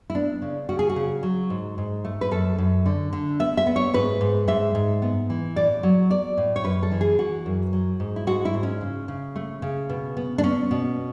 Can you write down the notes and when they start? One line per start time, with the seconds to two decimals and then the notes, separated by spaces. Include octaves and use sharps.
0.10 E4
0.15 B3 D4
0.42 C#3
0.69 C#3 F#4
0.79 G#4
0.89 F#4
0.96 C#3
1.23 F#3
1.50 G#2
1.78 G#2
2.05 A3
2.21 B4
2.31 F#2 A4
2.58 F#2
2.86 D3
3.13 D3
3.40 B3 E5
3.57 E5
3.67 B3
3.76 C#5
3.94 G#2 B4
4.21 G#2
4.48 G#2 E5
4.75 G#2
5.02 B3
5.30 E3
5.56 A2 D5
5.83 F#3
6.10 B3 D5
6.37 A2
6.56 C#5
6.64 F#2 B4
6.83 A4
6.92 E3
7.01 G#4
7.19 E3 F#4
7.46 F#2
7.73 F#3
8.00 G#2
8.16 E4
8.27 G#2 F#4
8.45 E4
8.54 G#2
8.63 C#4
8.81 C#3
9.08 C#3
9.36 A3
9.62 C#3
9.89 B2
10.17 B3
10.38 D4
10.44 B3 C#4
10.71 B2